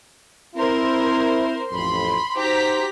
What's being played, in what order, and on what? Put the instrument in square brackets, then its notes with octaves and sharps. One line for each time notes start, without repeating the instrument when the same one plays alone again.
[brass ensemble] C4 E4 [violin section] A#4 C5
[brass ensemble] A1 F2 [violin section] B5 C6
[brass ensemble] D#4 F#4 C5 [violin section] G4 A#5 B6